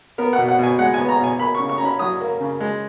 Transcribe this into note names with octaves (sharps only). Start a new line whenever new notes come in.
B3 A#4
F#5
B2
F#5
B2 G#5
G#3 F#5
B3 G#5
A#5
B2 G#5
A#3 B5
C#3 C#6
C#6
C#4 A#5
B5
F#3 D#6
A#3
C#3
G#3